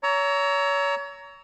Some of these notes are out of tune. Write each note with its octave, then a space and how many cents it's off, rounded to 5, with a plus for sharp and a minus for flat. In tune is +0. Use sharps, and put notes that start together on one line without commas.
C#5 +30 A#5 +0 E6 -5